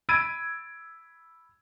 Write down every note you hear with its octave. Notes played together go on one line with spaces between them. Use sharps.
B5 E6 G#6 A6 D7 D#7